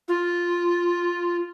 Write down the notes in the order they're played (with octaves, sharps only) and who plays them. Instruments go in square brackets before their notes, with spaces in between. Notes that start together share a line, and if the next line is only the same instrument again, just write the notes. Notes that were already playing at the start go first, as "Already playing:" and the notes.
[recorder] F4